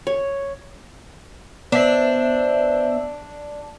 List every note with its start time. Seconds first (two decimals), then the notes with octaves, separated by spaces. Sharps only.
0.07 C#5
1.72 B3 D4 C5 E5